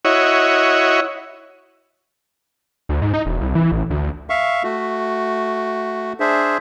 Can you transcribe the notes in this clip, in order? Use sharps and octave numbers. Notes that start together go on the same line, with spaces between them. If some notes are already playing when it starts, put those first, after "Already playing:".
E4 F#4 C#5 D#5
D2
G#2
D#4
E1
C2
E3
A1
D2
E5 F5 C#6
A3 F#4
D4 G#4 C5 E5